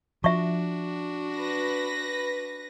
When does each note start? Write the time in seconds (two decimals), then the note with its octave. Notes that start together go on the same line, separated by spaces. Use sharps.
0.24 F3 D4 F#4 E5 C#6
1.35 B4 A#6